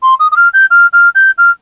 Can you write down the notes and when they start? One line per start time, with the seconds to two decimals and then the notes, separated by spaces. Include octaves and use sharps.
0.03 C6
0.20 D#6
0.32 D#6
0.36 F6
0.54 G6
0.71 F6
0.93 F6
1.15 G6
1.38 F6